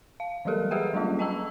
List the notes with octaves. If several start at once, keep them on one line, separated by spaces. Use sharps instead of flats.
F5
E3 F#3 G3 G4 A4 A#4
G4 G#4 B4 E5 F#5 G5
F#3 G3 A3 A#3 C#4 F4
D#5 G5 A5 A#5 E6